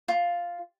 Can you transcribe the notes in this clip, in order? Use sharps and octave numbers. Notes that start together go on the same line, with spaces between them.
F4